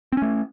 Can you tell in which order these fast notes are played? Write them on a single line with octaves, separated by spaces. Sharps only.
C4 C#4 A3